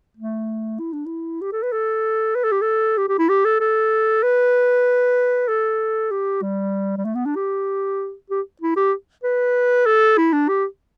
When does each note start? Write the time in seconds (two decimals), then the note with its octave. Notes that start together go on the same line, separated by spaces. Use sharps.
0.17 A3
0.79 E4
0.93 D4
1.06 E4
1.41 G4
1.52 A4
1.63 B4
1.72 A4
2.35 B4
2.44 A4
2.52 G4
2.61 A4
2.98 G4
3.08 G4
3.19 E4
3.29 G4
3.45 A4
3.60 A4
4.23 B4
5.48 A4
6.11 G4
6.42 G3
6.97 G3
7.05 A3
7.15 B3
7.25 D4
7.36 G4
8.30 G4
8.61 E4
8.76 G4
9.24 B4
9.86 A4
10.18 E4
10.33 D4
10.48 G4